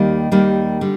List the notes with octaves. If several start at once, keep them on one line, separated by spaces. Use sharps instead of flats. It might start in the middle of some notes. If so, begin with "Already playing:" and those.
Already playing: D#2 D#3 G3 A#3
D#2 D#3 G3 A#3
D3 G3